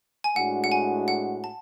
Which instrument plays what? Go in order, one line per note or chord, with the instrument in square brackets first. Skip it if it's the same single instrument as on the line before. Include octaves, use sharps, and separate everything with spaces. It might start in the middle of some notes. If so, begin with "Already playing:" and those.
[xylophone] G#5
[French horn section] A2 G#3 D4 F#4 [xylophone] F#5
[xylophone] F#5
G#5
F#5
A5